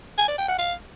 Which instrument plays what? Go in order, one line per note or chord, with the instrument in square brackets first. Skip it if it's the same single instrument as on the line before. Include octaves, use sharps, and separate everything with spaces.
[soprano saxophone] G#5
D5
G5
F#5
F5